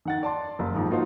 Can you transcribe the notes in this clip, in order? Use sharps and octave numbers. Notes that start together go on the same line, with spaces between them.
D#3 F#5 A6
D5 A5 C6
F#1
G#2 D#3 F3
A#3 D#4 F4 F#4 C5